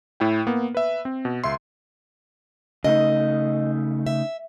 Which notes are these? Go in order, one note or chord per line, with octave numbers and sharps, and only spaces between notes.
A2 E4 G5
A#3 B3
B4 E5
C4
B2
C#2 E5 C6
C#3 A3 D#4 D#5
E5